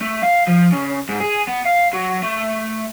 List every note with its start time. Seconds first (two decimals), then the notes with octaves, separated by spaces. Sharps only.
0.01 A3
0.23 F5
0.48 F3
0.72 C#3
1.09 G#2
1.20 G#4
1.47 B3
1.65 F5
1.93 F#3
2.22 A3